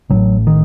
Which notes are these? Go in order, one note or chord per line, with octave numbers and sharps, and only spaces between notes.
A1 A2 D#3 F#3
D#3